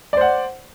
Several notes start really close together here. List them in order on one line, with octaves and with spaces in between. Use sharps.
D5 C5 F#5